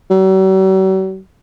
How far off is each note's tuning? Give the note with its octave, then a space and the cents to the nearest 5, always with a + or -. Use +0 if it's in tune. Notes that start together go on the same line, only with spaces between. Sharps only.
F#3 +45